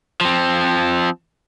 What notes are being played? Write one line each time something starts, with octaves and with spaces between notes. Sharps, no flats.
F3 C4